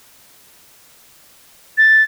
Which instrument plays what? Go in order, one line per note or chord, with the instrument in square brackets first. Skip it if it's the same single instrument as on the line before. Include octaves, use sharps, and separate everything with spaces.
[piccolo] A6